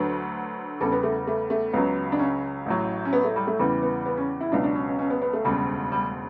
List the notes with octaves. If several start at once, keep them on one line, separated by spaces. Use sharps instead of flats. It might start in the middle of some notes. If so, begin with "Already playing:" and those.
Already playing: D2 D3 F#3 B4
E2 C#3 G3 A4
B3
A3
A3
A3
C#2 C#3 F#3 B3
D4
C#4
A1 A2 F#3
C#4
B3
A3
G3
A3
E2 C#3 E3 G3
B3
B3
C#4
E4
C#2 B2 F#3 D4
D4
C#4
C#4
C#4
B3
B3
A3
E1 D2 C#3 G3
G3